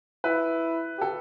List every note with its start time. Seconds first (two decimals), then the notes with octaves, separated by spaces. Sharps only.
0.24 E4 B4
0.98 G4 A4